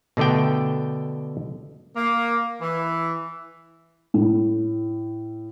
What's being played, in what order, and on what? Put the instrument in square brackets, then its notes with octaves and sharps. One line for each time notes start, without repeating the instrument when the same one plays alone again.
[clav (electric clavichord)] B2 D3 A3 D5 G5
[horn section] A#3
E3
[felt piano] A2